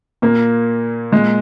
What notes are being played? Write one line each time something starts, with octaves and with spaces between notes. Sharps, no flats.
A#2 A#3
A#2 G#3